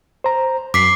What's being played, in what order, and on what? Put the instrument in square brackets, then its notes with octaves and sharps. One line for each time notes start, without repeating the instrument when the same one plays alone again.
[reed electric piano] C5 A#5
[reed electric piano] F#2 [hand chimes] D6 B6 C7